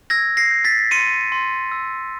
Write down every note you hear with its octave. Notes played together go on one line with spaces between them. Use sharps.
E6 G#6 A#6
A#6 C7
G6
A6 B6
C6 C#7 D#7
C6
E6